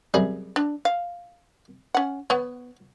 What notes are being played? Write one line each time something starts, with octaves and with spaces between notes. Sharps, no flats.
F#2 C3 G3 G#4
D4
F5
C#4 F#5
B3 C#5 F#5